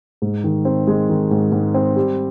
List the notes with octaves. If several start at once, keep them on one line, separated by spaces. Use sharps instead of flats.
G#2
D#3
C4
G#3
D#3
G#2
G#2
C4
G3